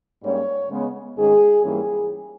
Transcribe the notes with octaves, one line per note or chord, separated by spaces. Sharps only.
G#2 G3 A#3 C#4 C#5
C#3 G#3 B3
G#2 D#3 G#3 C#4 G#4
G#2 E3 G3 A#3 C#4 G#4